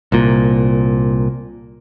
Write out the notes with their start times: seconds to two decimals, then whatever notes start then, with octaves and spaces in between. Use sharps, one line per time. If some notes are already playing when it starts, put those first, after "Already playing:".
0.12 C2 A#2